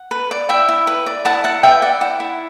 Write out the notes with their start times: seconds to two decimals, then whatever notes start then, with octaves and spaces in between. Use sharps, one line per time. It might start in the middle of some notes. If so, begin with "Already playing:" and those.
Already playing: F#5
0.11 B4
0.31 D5
0.49 E4 E5 G5
0.68 E4
0.87 B4
1.06 D5
1.25 E4 F#5 A5
1.44 E4 F#5 A5
1.63 B4 E5 G5
1.82 D5 F#5
2.01 E4 F#5
2.20 E4